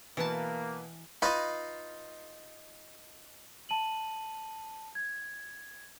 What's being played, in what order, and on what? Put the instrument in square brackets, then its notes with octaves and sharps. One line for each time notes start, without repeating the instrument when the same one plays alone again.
[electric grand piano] B2 B4 [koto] E3 A5 [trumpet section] A#3
[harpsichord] D#4 F4 F5 [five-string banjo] B4 D#5
[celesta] A5 D#7 F#7
G#6